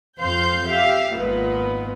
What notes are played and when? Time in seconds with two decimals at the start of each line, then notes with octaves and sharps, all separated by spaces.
0.19 F2 C5 F5 C6 G6
0.67 G4 E5 F5
1.14 G#1 A#2 G#3 B3